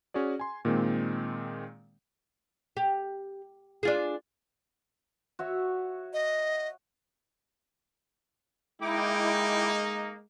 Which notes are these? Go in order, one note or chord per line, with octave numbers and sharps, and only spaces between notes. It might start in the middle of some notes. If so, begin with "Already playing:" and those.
C#4 F#4 G#4 D5
G#5 C6
A#2 D#3 G#3 A#3 C4
G4
D4 F4 G#4
F#4 C#5 E5
D#5
G#3 A#3 D#4 E4 G5 D6